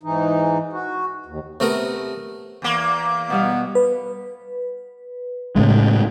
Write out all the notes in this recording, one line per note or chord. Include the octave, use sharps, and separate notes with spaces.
G#2 E3 D#4
F#4
D#2
C3 A3 B3 A#4
E2 A#3
B2 G3 B3 F5
B4
A2 C#3 G#3